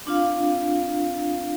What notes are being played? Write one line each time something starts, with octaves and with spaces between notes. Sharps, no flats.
C4 D4 F4 F5